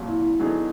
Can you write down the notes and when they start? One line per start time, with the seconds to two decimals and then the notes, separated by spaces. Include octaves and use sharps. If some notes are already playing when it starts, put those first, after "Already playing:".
Already playing: C2 A#2 F#3
0.08 E4
0.39 D3 F#3 B3 D#4 G#4